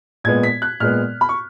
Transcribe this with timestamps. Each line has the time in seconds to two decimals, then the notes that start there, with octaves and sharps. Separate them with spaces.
0.24 A#2 G#3 B3 G#6
0.43 B6
0.62 F#6
0.80 A#2 G#3 B3 F6
1.21 B5
1.29 C#6